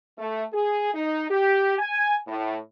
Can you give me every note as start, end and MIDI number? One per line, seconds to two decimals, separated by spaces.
0.18 0.44 57
0.53 0.91 68
0.94 1.26 63
1.30 1.76 67
1.79 2.18 80
2.27 2.57 45